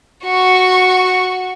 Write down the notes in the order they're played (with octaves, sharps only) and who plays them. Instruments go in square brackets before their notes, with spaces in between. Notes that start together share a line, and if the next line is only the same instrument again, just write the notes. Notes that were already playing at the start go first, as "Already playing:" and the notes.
[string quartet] F#4 C#6